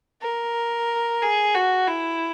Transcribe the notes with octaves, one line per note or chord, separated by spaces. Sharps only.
A#4
G#4
F#4
E4